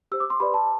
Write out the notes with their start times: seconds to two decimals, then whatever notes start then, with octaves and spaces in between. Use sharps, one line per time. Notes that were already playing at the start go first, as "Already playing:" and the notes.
0.12 G4 C5 E6
0.20 D6
0.30 C6
0.40 G4 B4 D5 B5
0.54 A5